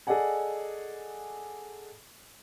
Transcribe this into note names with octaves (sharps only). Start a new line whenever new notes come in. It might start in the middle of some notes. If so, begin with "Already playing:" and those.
G#4 A4 D5 D#5 F#5 G#5